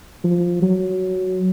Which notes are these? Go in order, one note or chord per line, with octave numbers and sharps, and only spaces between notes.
F3
F#3